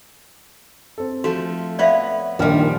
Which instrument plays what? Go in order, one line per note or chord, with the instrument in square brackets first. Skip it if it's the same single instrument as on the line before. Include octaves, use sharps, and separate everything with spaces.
[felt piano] C4 A4
[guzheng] F3 A3 [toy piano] F#4
[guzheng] B3 B4 C#5 [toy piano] D5 E5 F5
[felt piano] A#1 D4 F6 [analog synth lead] D#3 [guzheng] F3 G3